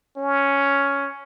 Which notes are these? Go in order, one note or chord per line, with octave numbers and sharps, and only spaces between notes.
C#4